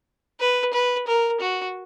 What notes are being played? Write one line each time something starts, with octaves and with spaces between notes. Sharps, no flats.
B4
B4
A#4
F#4